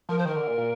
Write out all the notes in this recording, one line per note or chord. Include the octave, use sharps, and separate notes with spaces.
F3 A#4
C5
D#3 A#4
D3
A#2
A#2